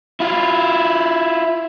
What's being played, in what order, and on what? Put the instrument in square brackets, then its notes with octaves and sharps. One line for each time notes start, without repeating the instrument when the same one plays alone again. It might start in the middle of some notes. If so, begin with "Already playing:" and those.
[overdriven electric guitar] E4 F4